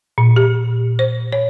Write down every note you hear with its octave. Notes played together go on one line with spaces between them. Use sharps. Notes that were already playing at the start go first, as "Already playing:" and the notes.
A#2
G4
C5
C#5